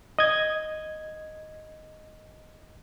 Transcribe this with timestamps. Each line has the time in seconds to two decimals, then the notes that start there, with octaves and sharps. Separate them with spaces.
0.19 D#5 G#6